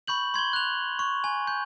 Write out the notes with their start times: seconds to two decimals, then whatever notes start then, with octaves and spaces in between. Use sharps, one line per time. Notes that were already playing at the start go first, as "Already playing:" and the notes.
0.08 B5 C#6 G6 F#7
0.34 C6 G#6 F#7 G7
0.53 F#6 F7
0.99 C#6
1.24 G#5
1.47 G6